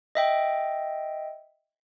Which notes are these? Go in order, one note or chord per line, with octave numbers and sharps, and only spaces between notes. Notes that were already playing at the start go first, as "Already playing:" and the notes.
D#5 E5 G5